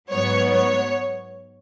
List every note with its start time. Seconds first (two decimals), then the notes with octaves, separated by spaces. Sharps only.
0.11 G#2 F#3 B3 C#5
0.53 C#5